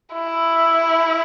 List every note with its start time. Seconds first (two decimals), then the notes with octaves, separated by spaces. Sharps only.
0.13 E4